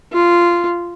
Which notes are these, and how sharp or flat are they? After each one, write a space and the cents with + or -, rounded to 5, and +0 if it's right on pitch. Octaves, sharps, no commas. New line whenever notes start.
F4 -10